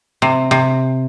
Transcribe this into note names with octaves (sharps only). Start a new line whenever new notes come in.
C3
C3